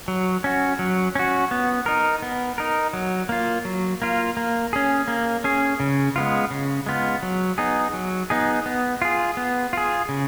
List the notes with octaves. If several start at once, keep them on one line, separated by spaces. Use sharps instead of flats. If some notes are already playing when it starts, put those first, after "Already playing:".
F#3
C#4 F#4
F#3
C#4 F#4
B3
D#4 A#4
B3
D#4 A#4
F#3
A#3 F4
F#3
A#3 F4
A#3
C#4 G#4
A#3
C#4 G#4
C#3
G#3 B3 F4
C#3
G#3 B3 F4
F#3
B3 D#4 G#4
F#3
B3 D#4 G#4
B3
F4 G#4
B3
F4 G#4
C#3